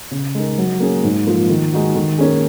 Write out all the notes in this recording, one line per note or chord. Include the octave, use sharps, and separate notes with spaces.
C#3
G#3 D#4 A#4
F#3
A#3 C#4 G#4
G#2
F3 A#3 F4 A#4
D#3
G#3 D#4 F#4
D#3
A#3 C#4 G#4